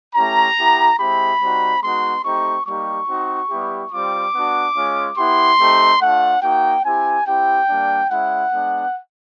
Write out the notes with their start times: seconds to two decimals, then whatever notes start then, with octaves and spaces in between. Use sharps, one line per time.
0.15 A3 C#4 E4 G4 A#5
0.57 B3 E4 G4
0.99 G#3 C4 E4 G4 B5
1.41 G3 C4 D#4 F#4
1.83 G#3 B3 D#4 F#4 C6
2.25 A3 C4 D#4 G4 C#6
2.67 G3 A#3 D#4 G4 C#6
3.08 C4 D#4 F#4
3.50 G3 B3 E4 G4
3.92 G3 C4 F4 D6
4.34 B3 D4 F#4
4.76 G#3 C#4 F4
5.18 B3 E4 G4 C6
5.59 A3 C4 D#4 G4
6.02 A3 D4 F4 F#5
6.42 A#3 D#4 F#4 G5
6.85 C4 E4 G4 G#5
7.26 C4 E4 G4 G5
7.68 G3 A#3 D4
8.10 G#3 C#4 E4 F#5
8.52 G#3 B3 D4